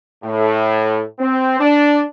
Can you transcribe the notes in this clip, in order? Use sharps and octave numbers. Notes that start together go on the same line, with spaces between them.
A2
C4
D4